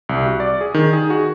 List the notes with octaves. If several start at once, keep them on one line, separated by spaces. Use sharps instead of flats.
C2
F#4
D5
G#4
D#3
G#4
F#4